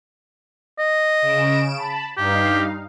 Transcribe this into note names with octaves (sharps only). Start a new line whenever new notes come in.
D#5
C#3 D7 E7
A5 B5
G2 D#4 G4 F5